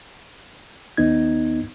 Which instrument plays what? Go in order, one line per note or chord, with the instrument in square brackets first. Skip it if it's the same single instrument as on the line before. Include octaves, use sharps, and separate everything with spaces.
[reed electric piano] D#2 B3 D#4 G#6